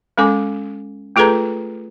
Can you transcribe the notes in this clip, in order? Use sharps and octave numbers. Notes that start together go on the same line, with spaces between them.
G#3 C#4 A4 G#5 D6
A3 F4 G#4 A4 B4 A#5